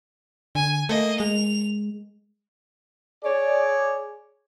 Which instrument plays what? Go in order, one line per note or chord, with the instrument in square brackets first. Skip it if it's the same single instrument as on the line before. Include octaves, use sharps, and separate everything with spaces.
[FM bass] D3 [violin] G#5
[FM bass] A3 [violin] A#3 D#5
[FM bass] G#3 [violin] F7
[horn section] G#4 C#5 D5